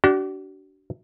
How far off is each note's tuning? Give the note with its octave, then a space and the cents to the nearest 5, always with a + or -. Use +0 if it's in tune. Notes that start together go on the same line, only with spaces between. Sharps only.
D4 -15 F#4 +40